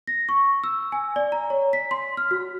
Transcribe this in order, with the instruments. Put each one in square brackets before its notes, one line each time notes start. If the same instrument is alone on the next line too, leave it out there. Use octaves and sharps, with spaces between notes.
[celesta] A#6
C#6
E6
G#5
D5
A#5
C#5
B6
C6
F6
F#4